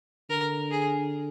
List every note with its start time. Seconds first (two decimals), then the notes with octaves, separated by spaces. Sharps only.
0.30 D3 A#4
0.71 G#4